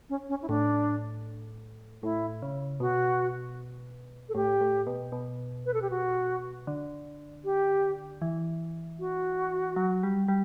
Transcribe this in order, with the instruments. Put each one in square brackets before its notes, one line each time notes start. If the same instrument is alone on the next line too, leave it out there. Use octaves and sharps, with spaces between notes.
[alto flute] C#4
C#4
E4
[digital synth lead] A2 [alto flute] D4
[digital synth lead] A2 [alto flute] E4
[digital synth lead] C#3
[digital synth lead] B2 [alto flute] F#4
[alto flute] A4
[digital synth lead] A2 [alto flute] G4
[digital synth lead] A2
B2
B2
[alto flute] B4
A4
G4
F#4
[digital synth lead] D3
[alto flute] G4
[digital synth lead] E3
[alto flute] F#4
[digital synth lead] F#3
G3
G3